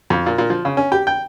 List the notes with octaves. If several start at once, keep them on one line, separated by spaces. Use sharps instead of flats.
F2
A#2
A#2
F3
C#3
C#4
G4
G5